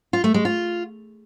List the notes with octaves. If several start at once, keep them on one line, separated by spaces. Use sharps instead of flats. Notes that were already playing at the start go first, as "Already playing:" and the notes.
F4
A3
G#3
F4